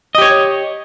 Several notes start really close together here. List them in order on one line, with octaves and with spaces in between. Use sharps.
D#5 G4 C#5